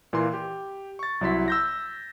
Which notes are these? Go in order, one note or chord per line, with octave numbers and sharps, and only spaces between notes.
A#2 E3 A#3 C6
G4
C#6 A6
C2 F#3 E4 C6 B6
E6 G6 A#6